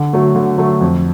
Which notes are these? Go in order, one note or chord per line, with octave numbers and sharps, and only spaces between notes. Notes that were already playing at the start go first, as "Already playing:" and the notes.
Already playing: D3
F#3 A3
D3
F#3 A3
F2